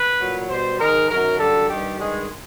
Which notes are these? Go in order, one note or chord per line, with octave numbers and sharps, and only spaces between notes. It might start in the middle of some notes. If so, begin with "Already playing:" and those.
Already playing: B4
A#2 F#3
B2 G3 C5
G#2 D#3 G#3 A#4
F#2 D#3 F#3 A#4
F#2 D3 G3 A4
G2 D#3 G3 G4
G2 D#3 G#3